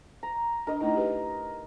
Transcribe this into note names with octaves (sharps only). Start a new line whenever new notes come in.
A#5
D4 A#4 D#5
A3 D#4 E4 A#5
G4 G#4 B4